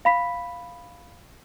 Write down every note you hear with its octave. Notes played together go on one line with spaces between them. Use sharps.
F5 B5 B6